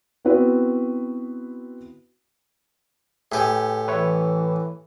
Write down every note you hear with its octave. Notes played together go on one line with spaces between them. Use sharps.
B3 C4 E4 F#4 B4
A2 G4 G#4 B4 G#5
E3 B4 C#5 E5